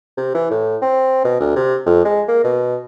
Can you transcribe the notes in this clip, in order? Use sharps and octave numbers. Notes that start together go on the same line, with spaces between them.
C3
E3
A2
C4
B2
D2
C3
F2
G#3
A#3
B2